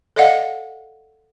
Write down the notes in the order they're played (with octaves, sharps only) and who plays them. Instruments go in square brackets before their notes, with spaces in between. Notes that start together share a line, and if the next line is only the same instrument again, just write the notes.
[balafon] A4 D5 D#5 F5 F#5